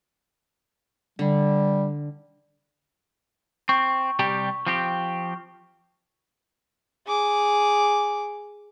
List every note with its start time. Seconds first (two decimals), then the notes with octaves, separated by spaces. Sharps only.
1.19 D3 G3
3.69 C4 C#6
4.19 C3 G3 G4
4.67 F3 C4 G4
7.07 G#4 D6